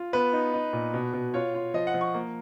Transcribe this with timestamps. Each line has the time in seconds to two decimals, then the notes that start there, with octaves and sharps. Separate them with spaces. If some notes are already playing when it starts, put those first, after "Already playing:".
Already playing: F4
0.13 B3 B4
0.33 D#4
0.54 D#4
0.73 A#2
0.94 B2
1.13 B2
1.34 F4 C#5
1.54 F4
1.74 F3 D#5
1.87 F#5
1.94 F3
2.01 C#6
2.14 A#3